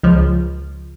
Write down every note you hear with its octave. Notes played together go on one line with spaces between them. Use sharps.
C#2 F3